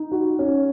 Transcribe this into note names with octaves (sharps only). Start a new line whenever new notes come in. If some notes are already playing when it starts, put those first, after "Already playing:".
Already playing: D#4
F#4
C#4